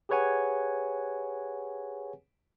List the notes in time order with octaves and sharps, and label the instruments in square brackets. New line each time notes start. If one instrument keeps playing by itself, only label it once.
[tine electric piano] G4 G#4 B4 C#5 F#5 G#5